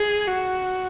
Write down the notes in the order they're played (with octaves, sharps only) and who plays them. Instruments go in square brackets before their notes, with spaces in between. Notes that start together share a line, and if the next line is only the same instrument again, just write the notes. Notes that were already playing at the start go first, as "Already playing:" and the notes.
Already playing: [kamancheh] G#4
F#4